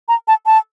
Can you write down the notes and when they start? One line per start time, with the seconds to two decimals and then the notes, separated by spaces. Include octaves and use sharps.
0.09 A#5
0.28 A5
0.46 A5